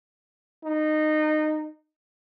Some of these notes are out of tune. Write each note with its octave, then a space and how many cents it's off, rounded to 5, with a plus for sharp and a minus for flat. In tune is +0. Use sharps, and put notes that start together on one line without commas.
D#4 -20